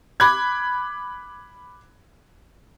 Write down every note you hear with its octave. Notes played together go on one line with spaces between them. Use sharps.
B5 D6 F#6 G#6